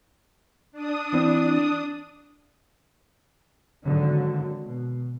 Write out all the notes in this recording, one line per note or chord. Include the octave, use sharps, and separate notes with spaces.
D4 D#6
E3 C4
G#1 D3 D#3 F#3
B2